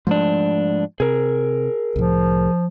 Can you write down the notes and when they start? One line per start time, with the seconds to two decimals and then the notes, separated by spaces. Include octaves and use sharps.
0.07 G#2 F3 A3 D4
1.00 C3 G#4 A#4
1.96 C2 A2 F3